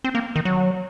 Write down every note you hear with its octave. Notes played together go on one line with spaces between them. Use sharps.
C4
A#3
D#3
F#3